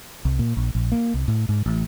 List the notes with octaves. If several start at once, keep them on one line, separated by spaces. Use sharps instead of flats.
C2
A#2
A#1
A#1
A#3
C2
A2
G#2
A1